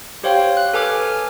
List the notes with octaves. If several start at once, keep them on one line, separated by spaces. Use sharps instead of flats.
G4 C5 C#5 F5 G5
F#6
A4 B4 G#5 D6 F6